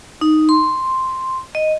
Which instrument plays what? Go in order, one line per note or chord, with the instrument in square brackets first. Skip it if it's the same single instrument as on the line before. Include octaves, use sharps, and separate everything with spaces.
[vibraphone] D#4
C6
D#5